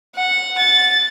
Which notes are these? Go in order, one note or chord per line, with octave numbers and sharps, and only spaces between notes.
F#5
A6